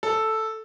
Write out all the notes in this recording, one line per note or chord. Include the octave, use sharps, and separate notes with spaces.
A4